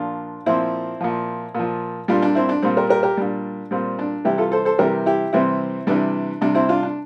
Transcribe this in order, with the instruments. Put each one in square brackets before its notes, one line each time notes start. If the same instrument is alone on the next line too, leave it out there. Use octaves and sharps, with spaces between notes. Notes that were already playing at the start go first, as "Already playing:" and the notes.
Already playing: [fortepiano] A#2 F3 D4 F4
A#2 F3 C4 E4
A#2 F3
A#2 F3
A#2 G3 D4 F4
D4
C4 E4
D4
A#2 G3 C4
G4 A#4
G4 A#4
G4 A#4
A#2 G3 D4
A#2 G3 C4
D4
C3 E3 G3 E4 G4
F4 A4
A4 C5
A4 C5
C3 E3 G3 G4 A#4
E4 G4
C3 E3 G3 C4 E4
C3 E3 G3 D4
C3 G3 D4
C4 E4
D4 F4
D4